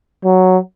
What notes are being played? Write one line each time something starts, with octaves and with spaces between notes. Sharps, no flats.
F#3